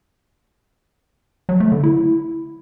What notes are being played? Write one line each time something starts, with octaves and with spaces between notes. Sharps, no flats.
F#3
A3
D3
E4